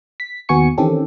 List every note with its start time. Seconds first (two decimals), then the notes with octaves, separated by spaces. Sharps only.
0.20 B6
0.49 D#2 B3 F#4 G#5 C#6 C#7
0.78 D#3 E3 C4 C#4 G4 A4